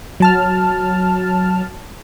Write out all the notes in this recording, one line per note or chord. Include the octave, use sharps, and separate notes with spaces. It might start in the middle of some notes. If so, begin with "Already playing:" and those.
F#3 A5 F6